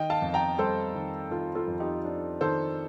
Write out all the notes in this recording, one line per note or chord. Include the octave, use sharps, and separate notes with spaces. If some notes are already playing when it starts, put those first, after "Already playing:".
Already playing: D#3 D#5 G5
F5 A5
F2
G5 A#5
G3 A4 C5
D#3
D#3 F4 A4
F4 A4
F2
D#4 G4
D4
D#3 A4 C5